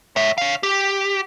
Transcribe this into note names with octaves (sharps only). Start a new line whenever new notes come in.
C#5 E5
C#5 F5
G4